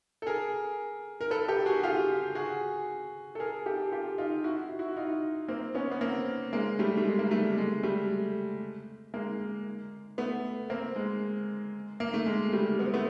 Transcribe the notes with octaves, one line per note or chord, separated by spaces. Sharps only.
A4
G#4 A#4
A#4
A4 B4
G4 A4
F#4 G#4
F4 G4
F#4 G#4
A4
G#4 A#4
G4 A4
F4 G4
D#4 F4
E4 F#4
E4 F#4
D#4 F4
A#3 C4
B3 C#4
B3
A#3 C4
G#3 A#3
G3 A3
A3
G#3
A#3
G3 A3
G#3
G3 A3
G#3 A#3
A3 B3
A#3 C4
G#3
A#3
A3
G#3
G3 A3
B3
C4
A3 B3